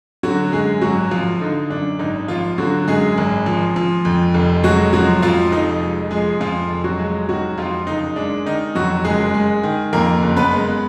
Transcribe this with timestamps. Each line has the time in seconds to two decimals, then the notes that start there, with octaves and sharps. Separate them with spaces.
0.23 D3 F#3 F#4
0.52 F#2 G#3 G#4
0.81 G#1 F#3 F#4
1.11 F3 F4
1.40 D3 D#4
1.70 F#2 D4
1.99 G#1 D#4
2.28 F3 F4
2.58 D3 F#3 F#4
2.88 F#2 G#3 G#4
3.18 G#1
3.46 F3
3.76 F3
4.05 F2
4.34 F1
4.63 F#3 G#3 F#4
4.93 F3 F#3 F#4
5.22 F2 F3 F4
5.52 F1 D#4
5.82 G#3
6.11 F3 G#3 G#4
6.40 F2 F3 F4
6.69 F1
6.84 F#3 F#4
6.99 G#3
7.29 D#3 F#3 F#4
7.58 F2 F3 F4
7.87 F#1 D#4
8.16 G#3 D4
8.46 D#3 D#4
8.75 F2 F#3 F#4
9.05 F#1 G#3 G#4
9.34 G#3
9.63 D#3
9.93 F2 A#3 A#4
10.23 F#1
10.37 B3 B4
10.52 G#3